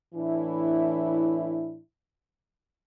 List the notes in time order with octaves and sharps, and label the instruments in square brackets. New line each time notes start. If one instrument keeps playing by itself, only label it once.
[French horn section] A2 E3 D4 E4